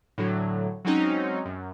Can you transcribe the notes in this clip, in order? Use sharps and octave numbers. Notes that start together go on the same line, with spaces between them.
A2 D3 F#3
F#3 G#3 C4 C#4 D#4
F#2